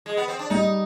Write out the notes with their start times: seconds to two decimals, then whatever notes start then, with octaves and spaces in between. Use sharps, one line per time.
0.06 G#3
0.17 B3
0.28 C4
0.39 D4
0.50 G3 D#4